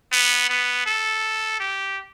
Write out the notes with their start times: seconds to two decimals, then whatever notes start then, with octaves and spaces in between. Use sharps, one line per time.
0.12 B3
0.49 B3
0.86 A4
1.60 G4